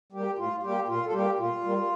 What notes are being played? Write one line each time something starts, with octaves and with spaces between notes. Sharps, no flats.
G3 A#3 G4
A2 F4
G3 A#3 G4
A#2 F4
A4
G3 A#3 G4
A#2 F4
G3 A#3